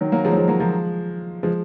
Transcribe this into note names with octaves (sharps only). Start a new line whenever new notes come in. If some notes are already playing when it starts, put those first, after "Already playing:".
D#3 F#3
F#3 A#3
F3 G#3
F#3
F3 G#3
F#3 A#3
F3 G#3
F3 G#3